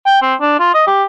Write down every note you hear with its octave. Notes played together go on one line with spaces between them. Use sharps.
G5
C4
D4
F4
D#5
G4